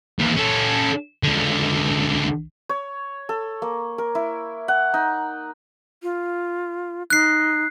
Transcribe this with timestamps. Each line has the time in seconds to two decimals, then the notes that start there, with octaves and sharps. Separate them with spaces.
0.19 D#2 E3
0.37 C#4 A4
1.23 C#2 D3
2.69 C#5
3.29 A4
3.62 A#3
3.98 A#4
4.15 E4
4.68 F#5
4.94 D#4
6.03 F4
7.10 D#4 F#6 C7